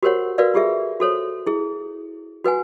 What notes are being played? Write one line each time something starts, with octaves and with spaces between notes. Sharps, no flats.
F#4 G4 A#4 C5 C#5 F#5
F#4 A#4 B4 D5 F5
F4 G4 G#4 E5
F#4 A4 C5 C#5
E4 G#4
F#4 B4 F#5 G#5